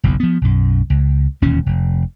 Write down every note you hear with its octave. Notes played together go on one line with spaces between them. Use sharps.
F#1 B1 E2
F3 B3
B1 F#2
C#2
E1 D#2 A#2 C#4
F1